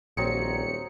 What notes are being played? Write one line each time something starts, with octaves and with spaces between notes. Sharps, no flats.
D#1 A#1 F#3 C4 G#4 C#7